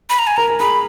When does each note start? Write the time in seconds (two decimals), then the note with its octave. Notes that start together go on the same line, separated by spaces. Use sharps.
0.10 B5
0.19 A#5
0.27 G#5
0.37 A#4 A#5
0.50 A#4
0.60 G#4 B5